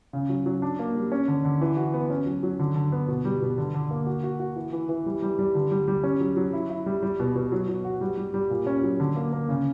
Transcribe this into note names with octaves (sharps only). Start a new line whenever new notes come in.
C#3
F#3
F#3
D4
A#3
G3
C#4
D3
D3
E3
F#4
B3
C#4
F#3
F#3
D3
D3
B3
B2
G3
B2
D3
D3
A#3
F#4
F#4
F#4
E3
E3
E3
G3
G3
G3
D3
G3
G3
C#4
F#3
F#3
E4
E4
G3
G3
B2
B2
F#3
F#3
F#4
G3
G3
G3
A#2
C#4
F#3
D3
A#3
A#3
C#3